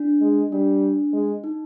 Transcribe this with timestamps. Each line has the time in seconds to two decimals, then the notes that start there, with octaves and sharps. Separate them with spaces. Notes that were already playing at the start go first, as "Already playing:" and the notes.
Already playing: D4
0.21 G#3
0.51 G3 D4
1.13 G#3
1.44 D#4